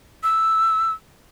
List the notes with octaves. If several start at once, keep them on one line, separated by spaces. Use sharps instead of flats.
E6